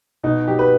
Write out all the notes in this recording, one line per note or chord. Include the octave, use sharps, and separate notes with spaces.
B2 D#4
F#3 G4
B4